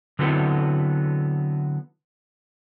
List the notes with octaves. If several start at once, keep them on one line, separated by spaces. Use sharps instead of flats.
D3 F#3 B3 C4 E4 A4